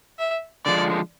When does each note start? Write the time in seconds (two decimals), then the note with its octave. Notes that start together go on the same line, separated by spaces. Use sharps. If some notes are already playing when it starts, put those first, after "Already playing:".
0.19 E5
0.66 D3 F3 G#3 D5